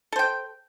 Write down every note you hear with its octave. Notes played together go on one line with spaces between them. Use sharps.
A4 C5 G5